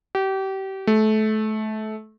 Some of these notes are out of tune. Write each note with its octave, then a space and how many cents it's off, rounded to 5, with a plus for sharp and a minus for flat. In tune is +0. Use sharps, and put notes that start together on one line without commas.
G4 -30
A3 -25